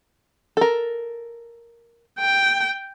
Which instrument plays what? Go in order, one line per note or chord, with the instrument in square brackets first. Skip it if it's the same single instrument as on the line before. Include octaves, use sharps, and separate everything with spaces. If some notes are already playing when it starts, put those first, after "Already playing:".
[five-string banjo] A4 A#4
[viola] G5